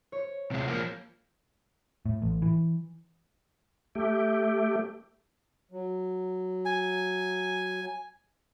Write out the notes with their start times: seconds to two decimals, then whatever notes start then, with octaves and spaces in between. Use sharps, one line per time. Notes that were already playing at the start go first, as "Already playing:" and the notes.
0.12 C#5
0.51 C3 G#3
0.68 F3 A#3
2.06 A2
2.22 A1
2.42 E3
3.95 A3 G4
5.71 F#3
6.65 G#5